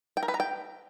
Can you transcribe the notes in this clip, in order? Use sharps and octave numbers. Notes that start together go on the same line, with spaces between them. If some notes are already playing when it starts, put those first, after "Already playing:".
G5
A#4
B4
A#5
G5